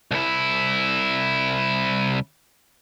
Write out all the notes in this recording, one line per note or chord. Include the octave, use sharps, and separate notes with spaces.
C2 E4